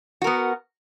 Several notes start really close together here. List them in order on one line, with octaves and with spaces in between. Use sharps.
F#4 A#4 B3